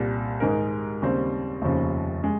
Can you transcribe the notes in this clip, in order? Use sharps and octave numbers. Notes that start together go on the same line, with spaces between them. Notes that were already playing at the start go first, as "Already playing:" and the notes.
Already playing: C2 A#2 G3
G#2 D#3 G#3 D#4 A#4
D#2 C#3 G3 C4
F1 D#2 C#3 F3
G#3